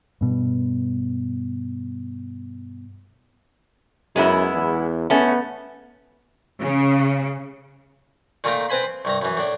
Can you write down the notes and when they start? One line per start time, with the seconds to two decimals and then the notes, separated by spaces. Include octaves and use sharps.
0.21 G2 B2
4.16 F#2 G#3 B3 E4
4.54 E2
5.10 A3 B3 C#4
6.61 C#3
8.44 A#2 D#3 A3 F4 G5 A#5
8.69 C4 B4 C5 G#5 B5 C6
8.83 C6
9.05 C2 G2 A#5
9.22 F#2 E3
9.37 A2 D4